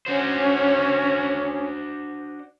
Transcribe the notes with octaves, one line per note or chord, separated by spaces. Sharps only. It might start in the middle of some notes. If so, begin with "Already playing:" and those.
C#4 D4 F#4 C5